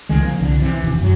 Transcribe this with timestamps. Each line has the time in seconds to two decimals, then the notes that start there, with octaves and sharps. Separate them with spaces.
0.09 C#2 D#3 G#3
0.22 F3 A#3
0.39 C2 D3
0.60 C3 E3
0.81 E1 D#2 E3
1.01 F#2 F#3